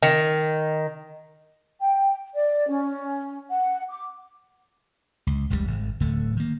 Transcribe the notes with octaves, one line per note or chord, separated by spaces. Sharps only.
D#3
G5
D5
C#4
F#5
D6
C#2
E1 C#2 A2 G3
G#1
D1 D3 A3
D#3 A#3